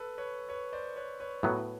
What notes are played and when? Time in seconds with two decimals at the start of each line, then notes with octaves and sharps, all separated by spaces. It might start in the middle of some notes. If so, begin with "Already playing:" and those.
Already playing: A4 B4
0.18 B4 C#5
0.49 B4 C#5
0.73 C5 D5
0.96 B4 C#5
1.20 B4 C#5
1.43 A2 F#3 B3 A4 B4